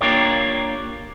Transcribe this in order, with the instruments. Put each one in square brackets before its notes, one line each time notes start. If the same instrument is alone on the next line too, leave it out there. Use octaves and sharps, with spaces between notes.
[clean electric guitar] A#3 D4 F4 G4 A#4 C#5